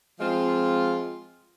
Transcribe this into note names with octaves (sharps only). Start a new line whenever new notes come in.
F3 G#3 C4 F4